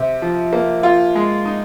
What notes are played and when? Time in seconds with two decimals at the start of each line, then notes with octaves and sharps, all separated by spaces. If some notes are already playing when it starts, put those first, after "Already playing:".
Already playing: C3
0.22 F3
0.53 A#3
0.83 F4
1.15 G#3
1.45 D#4